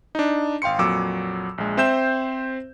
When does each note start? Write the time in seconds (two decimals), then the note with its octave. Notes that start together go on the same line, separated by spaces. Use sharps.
0.15 D4 D#4
0.62 G#1 F5 G5 C6 C#7
0.79 F2 A#2 F#3 D6 E6
1.58 A#1 G#3
1.77 C4 C5 E5 G5 G6 E7